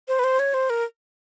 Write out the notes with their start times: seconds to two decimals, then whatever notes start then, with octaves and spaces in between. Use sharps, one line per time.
0.08 C5
0.19 B4
0.24 C5
0.39 C#5
0.54 C5
0.70 A#4